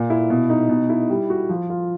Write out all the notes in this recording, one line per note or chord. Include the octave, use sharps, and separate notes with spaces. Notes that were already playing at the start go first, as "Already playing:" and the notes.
Already playing: A#2
E4
B2
D#4
B2
E4
G3
F#4
F3
F4